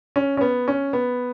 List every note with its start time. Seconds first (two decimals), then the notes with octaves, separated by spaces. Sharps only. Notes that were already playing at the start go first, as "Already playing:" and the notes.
0.16 C#4
0.37 C#4
0.41 B3
0.68 C#4
0.93 B3